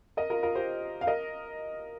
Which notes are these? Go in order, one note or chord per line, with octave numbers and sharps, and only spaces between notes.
A#4 D#5
F4 A#4
F4 A#4
G4 C5
F5
A#4 D#5